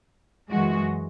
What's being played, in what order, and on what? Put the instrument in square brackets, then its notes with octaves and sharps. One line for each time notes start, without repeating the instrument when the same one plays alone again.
[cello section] F#2 E3 G#3 F#4